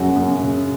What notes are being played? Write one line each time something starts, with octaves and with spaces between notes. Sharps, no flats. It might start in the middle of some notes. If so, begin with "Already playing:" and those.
Already playing: F#2 C#3 F#3 F#4
F#2
C#3